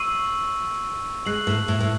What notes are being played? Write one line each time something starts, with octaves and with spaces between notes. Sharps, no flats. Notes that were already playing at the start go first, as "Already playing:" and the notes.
Already playing: C#6 E6 C7 D#7 F#7
G#3 F#6 C7 F#7
A2
A2
A2